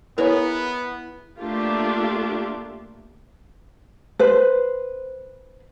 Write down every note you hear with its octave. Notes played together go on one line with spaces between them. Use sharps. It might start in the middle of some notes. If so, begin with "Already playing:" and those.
B3 E4 G#4 A#4 B4 C#5 A#5
A3 A#3 D4 F4 G4
B4 C5